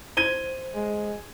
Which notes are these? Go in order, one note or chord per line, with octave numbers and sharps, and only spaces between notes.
C5 G#6 D#7 G7
G#3